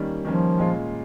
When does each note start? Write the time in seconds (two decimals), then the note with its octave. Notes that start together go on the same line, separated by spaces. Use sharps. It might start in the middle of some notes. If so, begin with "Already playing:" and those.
Already playing: D#3 G3 A#3 C#4
0.25 D#3 F3 G3 A#3 C#4
0.59 A#2 G#3 C#4 F4